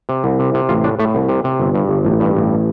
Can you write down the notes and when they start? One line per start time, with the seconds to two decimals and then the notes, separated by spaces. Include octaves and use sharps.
0.09 C3
0.24 C2
0.39 C3
0.54 C3
0.69 A1 F4
0.84 A2 D4
0.99 A2 A3
1.15 C2
1.29 C3
1.44 C3
1.60 G1
1.75 G2
1.89 G1
2.05 A1
2.20 G2
2.35 A1